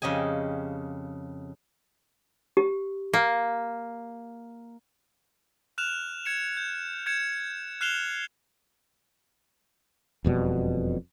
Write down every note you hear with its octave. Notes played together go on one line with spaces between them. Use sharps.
F2 C#3 G4 D#5 G#5
G4
A#3
F6 F#6 E7 F7
G#6 C#7 E7
G6
G6 G#6 C#7 E7
F6 F#6 C7 E7 F7 G7
E1 F2 B2 G3